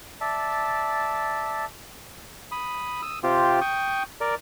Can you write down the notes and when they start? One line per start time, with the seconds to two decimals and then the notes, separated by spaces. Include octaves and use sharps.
0.21 D5 E5 A5
2.52 B5 D#6
3.02 D#6 E6
3.23 C3 C4 F4 G4
3.61 G5 C#6 D#6
4.21 A#4 D5